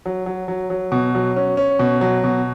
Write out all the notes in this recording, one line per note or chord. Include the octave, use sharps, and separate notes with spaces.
F#3
F#3
F#3
F#3
B2
F#3
C#4
C#4
B2
F#3
B2